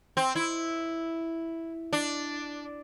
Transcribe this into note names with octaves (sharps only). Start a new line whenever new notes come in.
C4
E4
D4